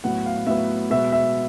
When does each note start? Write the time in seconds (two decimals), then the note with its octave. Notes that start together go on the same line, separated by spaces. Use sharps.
0.04 A2 F#3 B3 F#5
0.26 F5
0.47 A2 F#3 B3 E5
0.90 B2 G#3 B3 E5
1.12 E5